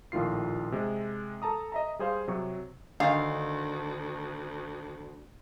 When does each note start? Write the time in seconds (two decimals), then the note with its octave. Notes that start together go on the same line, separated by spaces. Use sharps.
0.12 A#1 A2 D#3 F4 C7
0.72 C3 G#3
1.42 A4 A5 A#5 D#6
1.72 D#5 E5 A#5
1.99 G3 G#4 C5 F5
2.28 C3 F#3 C#6
3.00 D2 D3 D#3 D4 D#5 F5